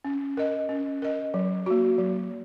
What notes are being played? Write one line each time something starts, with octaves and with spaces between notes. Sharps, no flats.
C#4
A#4 D#5
C#4
A#4 D#5
F#3
A#3 F#4
F#3